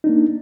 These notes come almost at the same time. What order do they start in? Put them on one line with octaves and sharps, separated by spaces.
D#4 D4 A#3